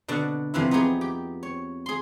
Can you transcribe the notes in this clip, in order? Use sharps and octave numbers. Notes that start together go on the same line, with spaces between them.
B2 D3 F#5 A5
F2 C3 E3 E4
B3 D#4 G4 G#4
G4
C#5
G#4 C6